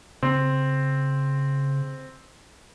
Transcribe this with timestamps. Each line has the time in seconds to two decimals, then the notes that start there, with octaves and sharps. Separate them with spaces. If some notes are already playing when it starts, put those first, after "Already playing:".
0.23 C#3 C4